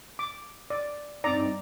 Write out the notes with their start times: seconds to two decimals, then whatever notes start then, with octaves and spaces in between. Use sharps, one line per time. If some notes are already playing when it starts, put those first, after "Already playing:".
0.19 D6
0.70 D5
1.24 G2 C4 D#4 D5 A#5